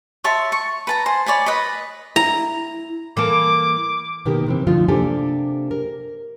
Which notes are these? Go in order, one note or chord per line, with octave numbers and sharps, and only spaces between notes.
C#5 E5 A5 C6
C#6
B4 A5 A#5
C5 G#5
C#5 D5 G#5 B5
B4 D#5 B5
E4 A#5
E3 A#3 A4 D6
B2 D#3 A#3 G4 A#4
C3 E3 C4
D3 F3 A3 D#4 F4
C3 A#3 D4 G4 A4 G#5
A#4